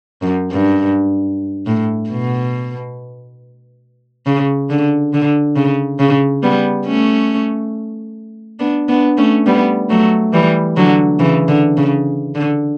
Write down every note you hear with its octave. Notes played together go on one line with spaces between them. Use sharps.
F#2
G2
A2
B2
C#3
D3
D3
C#3
C#3
G3 B3
A3 C#4
B3 D4
B3 D4
A3 C#4
G3 B3
F#3 A3
E3 G3
D3 F#3
C#3 E3
D3
C#3
D3